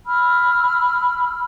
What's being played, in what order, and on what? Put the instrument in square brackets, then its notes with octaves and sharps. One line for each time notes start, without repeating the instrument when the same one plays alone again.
[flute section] B5 E6 F6